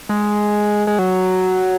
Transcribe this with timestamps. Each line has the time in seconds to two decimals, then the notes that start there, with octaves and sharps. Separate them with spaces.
0.09 G#3
0.87 G#3
0.99 F#3